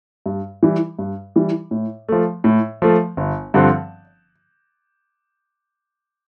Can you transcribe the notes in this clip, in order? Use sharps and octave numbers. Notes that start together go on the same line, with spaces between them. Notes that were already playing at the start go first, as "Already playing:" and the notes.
G2
E3 G3
G2
E3 G3
A2
F3 A3
A2
F3 A3
G1
G2 D3 F3 C4